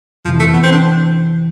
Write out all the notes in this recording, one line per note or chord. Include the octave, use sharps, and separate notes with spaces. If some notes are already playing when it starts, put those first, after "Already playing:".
F2 C3 E3 F3
A3
B3
C4
D4